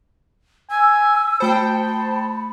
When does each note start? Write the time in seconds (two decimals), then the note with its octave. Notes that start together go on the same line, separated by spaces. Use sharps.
0.71 G#5 E6
1.40 A3 C5 G5 A5 B5 D#6 C#7